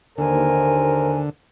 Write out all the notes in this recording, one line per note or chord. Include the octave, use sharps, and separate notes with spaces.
D#2 D3 A#4 C5 G#5